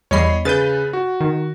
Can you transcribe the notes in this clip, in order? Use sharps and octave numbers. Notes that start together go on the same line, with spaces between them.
E2 G3 C#5 D#5 B5 C7
C#3 B4 G6 A6 D#7
F#4
D#3